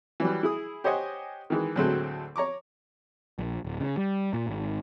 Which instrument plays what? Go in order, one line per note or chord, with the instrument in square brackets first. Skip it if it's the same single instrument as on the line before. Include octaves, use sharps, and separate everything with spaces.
[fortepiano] E3 F#3 G3
E4 G#4 D#6
G4 C5 C#5 D#5 F#5 G#5
D#3 E3 G#3
D2 A2 F#3 G#3 C4 A4
C#5 A#5 C#6 D6
[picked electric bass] A#1
D1
C#3
G3
A#2
G#1